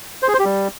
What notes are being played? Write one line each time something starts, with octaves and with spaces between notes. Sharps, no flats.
C5
G#4
C5
G4
G3